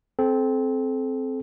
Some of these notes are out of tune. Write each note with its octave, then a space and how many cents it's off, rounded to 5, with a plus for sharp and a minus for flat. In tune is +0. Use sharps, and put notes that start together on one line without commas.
C4 +0 A4 -30